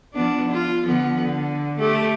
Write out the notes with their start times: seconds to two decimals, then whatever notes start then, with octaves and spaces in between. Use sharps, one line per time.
0.14 F3 B3 D4
0.52 F4
0.86 D3 F3 B3
1.21 D3
1.79 A3 G4